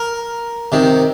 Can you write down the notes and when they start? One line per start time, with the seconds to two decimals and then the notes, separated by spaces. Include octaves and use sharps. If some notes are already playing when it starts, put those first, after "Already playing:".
Already playing: A#4
0.72 C3 D#3